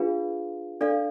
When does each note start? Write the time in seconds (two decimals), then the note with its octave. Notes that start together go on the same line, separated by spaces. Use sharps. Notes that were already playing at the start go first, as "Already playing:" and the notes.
Already playing: D4 F4 G#4 B4 F5
0.81 D4 A4 D5 F5